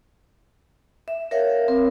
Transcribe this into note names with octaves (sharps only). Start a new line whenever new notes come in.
E5
A#4 C#5 E5 F5
C4 A#4